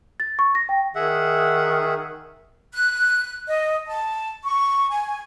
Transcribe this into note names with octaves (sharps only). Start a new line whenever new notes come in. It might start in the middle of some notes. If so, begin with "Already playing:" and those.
A6
C#6
A#6
G5
D#3 G#4 E5 F#5
F#6
D#5
A5
C#6
G#5